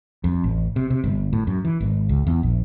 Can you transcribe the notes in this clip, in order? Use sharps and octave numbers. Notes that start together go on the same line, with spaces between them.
F2
A1
C3
C3
G1
A2
F#2
E3
G#1
C#2
E2
A#1